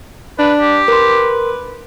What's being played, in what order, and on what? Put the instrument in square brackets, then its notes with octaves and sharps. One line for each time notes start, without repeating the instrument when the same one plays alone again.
[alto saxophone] D4 [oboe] B4
[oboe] G4
[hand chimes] A#4 C6 [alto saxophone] B4